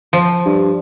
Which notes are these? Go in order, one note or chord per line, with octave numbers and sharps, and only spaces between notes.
F3
G2